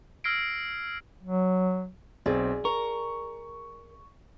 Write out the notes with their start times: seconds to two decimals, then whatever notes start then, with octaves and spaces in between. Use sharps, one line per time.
0.24 E6 F6 G#6 A#6 C7 D7
1.23 F#3
2.26 B1 C4 G#4 D5
2.65 A#4 C#6